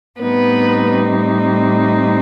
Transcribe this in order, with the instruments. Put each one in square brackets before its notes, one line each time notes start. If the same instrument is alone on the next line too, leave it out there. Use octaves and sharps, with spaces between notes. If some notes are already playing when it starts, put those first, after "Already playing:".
[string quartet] A2 G3 B3 C4 D#4 B4